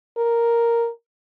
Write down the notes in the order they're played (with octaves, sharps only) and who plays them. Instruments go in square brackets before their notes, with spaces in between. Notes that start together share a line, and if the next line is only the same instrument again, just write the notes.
[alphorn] A#4